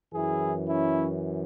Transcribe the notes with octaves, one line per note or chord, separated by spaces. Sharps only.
F#2 E3 E4 G#4
C#4 E4